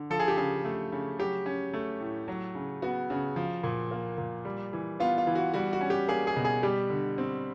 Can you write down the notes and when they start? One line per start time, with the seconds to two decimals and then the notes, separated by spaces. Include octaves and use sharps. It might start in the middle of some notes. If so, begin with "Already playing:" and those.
Already playing: D3
0.10 F3 A4
0.20 G#4
0.28 G4
0.37 C#3 G#4
0.64 A3
0.92 C#3
1.19 F#3 G4
1.46 C#4
1.73 A3
2.00 A2
2.28 F#3
2.55 C#3
2.82 B3 F#4
3.10 C#3
3.36 F3
3.63 A#2
3.91 A#3
4.18 A#2
4.45 G3
4.73 E3
5.00 B3 F4
5.18 F4
5.27 E3
5.35 F#4
5.54 G3 F#4
5.73 F#4
5.81 C#4
5.90 G4
6.08 A#3 G#4
6.27 G#4
6.36 B2
6.45 G#4
6.63 G3 G4
6.90 D3
7.18 C4